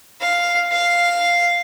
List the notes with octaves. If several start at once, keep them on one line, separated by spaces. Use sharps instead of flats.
F5
F5